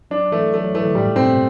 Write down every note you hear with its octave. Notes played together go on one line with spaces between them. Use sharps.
F#3 D4
E3 A3
F#3 A3
F#3
E3 A3
D3
A2 G3
G2
B2 C4
C3